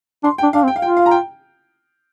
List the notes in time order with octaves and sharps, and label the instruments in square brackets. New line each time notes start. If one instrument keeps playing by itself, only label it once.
[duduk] D4 [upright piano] C6
[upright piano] G5
[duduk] D4
[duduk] D4 [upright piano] F5
[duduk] C4
[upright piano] G5
F5
[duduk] F4 [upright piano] G5
[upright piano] F5
A#5
G5